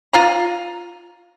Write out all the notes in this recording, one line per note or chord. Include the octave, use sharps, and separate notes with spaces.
F4 F5 A#5